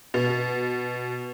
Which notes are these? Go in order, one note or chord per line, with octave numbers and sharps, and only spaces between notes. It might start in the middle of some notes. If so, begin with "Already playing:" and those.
B2